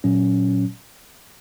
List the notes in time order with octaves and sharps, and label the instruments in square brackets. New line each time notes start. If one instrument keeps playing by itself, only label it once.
[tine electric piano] A#2 F#3 C#4